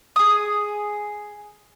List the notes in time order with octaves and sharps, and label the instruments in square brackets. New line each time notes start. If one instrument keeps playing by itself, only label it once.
[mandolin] G#4 D#6